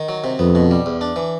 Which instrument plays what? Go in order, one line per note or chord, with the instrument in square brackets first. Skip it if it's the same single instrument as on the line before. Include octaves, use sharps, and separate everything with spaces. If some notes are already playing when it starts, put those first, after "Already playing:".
Already playing: [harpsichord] D#3
F#3
C3
[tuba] F2 [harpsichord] B3
[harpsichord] B2
G3
E2
D4
E3